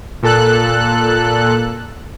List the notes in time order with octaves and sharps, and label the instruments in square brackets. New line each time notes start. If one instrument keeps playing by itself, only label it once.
[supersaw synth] A#2 A4 F#6